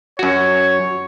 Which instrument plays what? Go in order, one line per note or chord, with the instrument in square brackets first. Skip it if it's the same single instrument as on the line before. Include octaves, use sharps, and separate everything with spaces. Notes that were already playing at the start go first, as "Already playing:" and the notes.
[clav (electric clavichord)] F#2 F#4 [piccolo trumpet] C#5